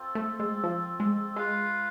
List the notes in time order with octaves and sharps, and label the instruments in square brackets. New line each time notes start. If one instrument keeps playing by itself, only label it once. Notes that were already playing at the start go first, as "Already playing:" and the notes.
Already playing: [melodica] C4 F4 A4
[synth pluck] A3
G#3
F3
G#3
[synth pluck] G#3 [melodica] F4 B4 F5